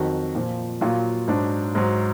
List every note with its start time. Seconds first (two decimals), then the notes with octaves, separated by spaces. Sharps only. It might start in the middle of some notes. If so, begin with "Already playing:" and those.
Already playing: F2 D#3 F#3 F#4
0.35 A#2 F3
0.81 A#2 F#3 F4
1.28 G#2 F#3 D4
1.75 G#2 F#3